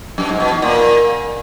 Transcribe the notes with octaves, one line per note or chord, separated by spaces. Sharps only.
F#2
G#2
B2
E2
A#2